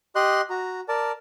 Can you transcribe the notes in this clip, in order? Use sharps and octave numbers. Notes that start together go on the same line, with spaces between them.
G4 D#5 C6 F#6
F#4 A#5
A#4 D5 A5